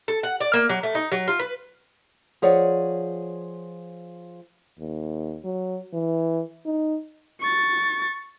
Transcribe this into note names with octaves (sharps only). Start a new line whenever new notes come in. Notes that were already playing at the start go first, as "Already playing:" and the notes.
A4
F#5
D5
A#3
F#3
A3
D#4
F#3
F4
B4
F3 G#4 C#5 D5 F#5
D#2
F#3
E3
D#4
C#6 A6